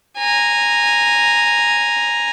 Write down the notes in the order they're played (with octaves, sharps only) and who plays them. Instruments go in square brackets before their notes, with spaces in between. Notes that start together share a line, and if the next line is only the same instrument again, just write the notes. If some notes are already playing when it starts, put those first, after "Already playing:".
[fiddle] G#5 A#5